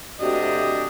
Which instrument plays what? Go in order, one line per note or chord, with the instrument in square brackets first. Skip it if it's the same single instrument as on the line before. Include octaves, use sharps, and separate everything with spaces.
[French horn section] C3 A3 F#4 [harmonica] D4 G4 D#5